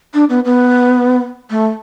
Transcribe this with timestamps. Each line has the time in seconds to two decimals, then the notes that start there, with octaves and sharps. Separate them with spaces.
0.14 D4
0.29 B3
0.45 B3
1.50 A3